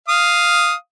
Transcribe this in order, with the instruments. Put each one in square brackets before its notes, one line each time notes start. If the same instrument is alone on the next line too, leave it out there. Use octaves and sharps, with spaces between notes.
[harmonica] F5 D#6